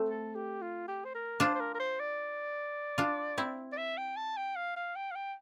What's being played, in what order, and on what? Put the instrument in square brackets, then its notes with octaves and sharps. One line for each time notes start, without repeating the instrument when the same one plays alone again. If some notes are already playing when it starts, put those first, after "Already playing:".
Already playing: [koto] A3 C4
[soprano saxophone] A4
G4
F4
G4
C5
A#4
[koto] D4 F4 [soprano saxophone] C5
[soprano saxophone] C5
A#4
A#4
C5
D5
[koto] D4 F4
C4 E4
[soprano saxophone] D5
E5
G5
A5
G5
F5
F5
G5
F5
G5